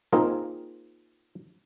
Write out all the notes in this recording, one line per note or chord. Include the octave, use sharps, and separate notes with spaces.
A#3 C4 D#4 F4 G#4 A#4